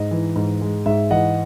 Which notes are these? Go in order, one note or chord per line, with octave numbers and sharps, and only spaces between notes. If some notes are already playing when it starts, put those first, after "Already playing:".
Already playing: G#2 D#5
E3
G#2
G#3
G#2 E5
E3 D#5 F#5